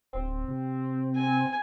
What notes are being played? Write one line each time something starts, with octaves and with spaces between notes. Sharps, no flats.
D1 C4
C3
G#5